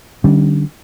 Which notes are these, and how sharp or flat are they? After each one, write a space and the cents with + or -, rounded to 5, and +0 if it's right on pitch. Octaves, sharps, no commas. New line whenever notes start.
D3 +30 G3 -20 C#4 +5